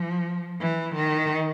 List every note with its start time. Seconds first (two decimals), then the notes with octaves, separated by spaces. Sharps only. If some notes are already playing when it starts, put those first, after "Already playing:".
Already playing: F3
0.61 E3
0.95 D#3